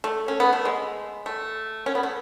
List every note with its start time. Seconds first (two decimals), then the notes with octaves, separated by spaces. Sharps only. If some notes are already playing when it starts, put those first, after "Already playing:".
0.04 A3
0.28 C#4
0.40 B3
0.53 A3
0.65 G#3
1.26 A3
1.86 C#4
1.95 B3
2.03 A3